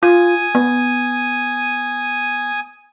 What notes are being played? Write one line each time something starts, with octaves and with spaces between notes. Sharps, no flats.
F4 G#5 D#6
B3